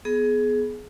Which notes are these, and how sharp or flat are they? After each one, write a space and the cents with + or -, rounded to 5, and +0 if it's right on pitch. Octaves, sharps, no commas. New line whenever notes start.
B3 +0 G#4 +20